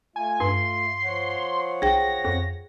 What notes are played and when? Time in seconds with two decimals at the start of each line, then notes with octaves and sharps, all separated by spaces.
0.16 A3 F4 G#5
0.40 G2 C6
1.04 F3 C#5 F#5
1.82 B1 G#4 G5 A#6
2.25 F2